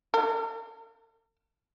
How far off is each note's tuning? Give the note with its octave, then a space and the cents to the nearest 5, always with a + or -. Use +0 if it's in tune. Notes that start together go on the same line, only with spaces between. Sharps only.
A4 +45